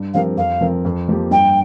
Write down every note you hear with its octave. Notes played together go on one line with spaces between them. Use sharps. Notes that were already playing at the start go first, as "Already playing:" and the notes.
Already playing: G2
F3 C4 G4 A#4 F5
F2 F5
F3 C4 A#4
F2
F3 A#3 G4
G2 G5